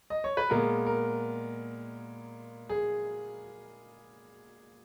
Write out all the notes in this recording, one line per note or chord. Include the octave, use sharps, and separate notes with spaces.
D#5
C#5
B4
A#2 G#3 B3 A#4
A#4
G#4